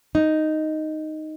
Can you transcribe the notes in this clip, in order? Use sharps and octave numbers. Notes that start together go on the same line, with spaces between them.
D#4